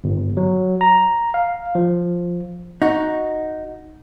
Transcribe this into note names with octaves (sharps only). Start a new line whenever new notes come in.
G1
F#3
A#5
F5
F3
D#4 F#4